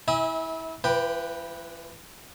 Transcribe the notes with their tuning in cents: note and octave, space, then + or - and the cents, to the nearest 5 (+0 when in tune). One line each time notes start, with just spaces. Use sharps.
E4 -25 E5 -45 G#5 -30
E3 +40 B4 -10 G5 +0